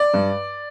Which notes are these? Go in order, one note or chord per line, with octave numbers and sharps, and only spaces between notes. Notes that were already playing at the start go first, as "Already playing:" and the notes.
Already playing: D5
G2